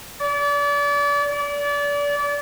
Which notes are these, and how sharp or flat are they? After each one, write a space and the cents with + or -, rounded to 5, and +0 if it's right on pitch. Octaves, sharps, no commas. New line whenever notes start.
D5 -35
D5 -30